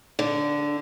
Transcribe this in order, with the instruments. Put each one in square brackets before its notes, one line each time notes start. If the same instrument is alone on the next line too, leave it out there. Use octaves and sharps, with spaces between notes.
[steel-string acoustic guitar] D3